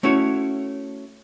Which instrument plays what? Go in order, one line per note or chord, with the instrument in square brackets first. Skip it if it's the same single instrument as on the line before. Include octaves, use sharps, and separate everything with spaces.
[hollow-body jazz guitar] A3 C#4 E4 F#4 C#5